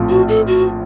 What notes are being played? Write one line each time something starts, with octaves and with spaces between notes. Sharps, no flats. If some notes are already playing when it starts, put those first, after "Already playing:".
Already playing: A#1 A2 F3 C4 F4
F#4
A4
F#4